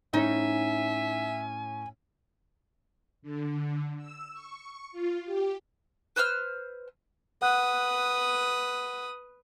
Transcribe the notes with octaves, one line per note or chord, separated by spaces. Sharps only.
A2 C#4 D#4 E5 G#5
D3
E6
C#6
F4
G4
B4 C5 E6 F6
B4 F#5 D#6 F#6